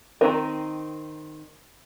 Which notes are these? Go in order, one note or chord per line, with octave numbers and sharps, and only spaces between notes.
D#3 G#3 C4 D#4 A#4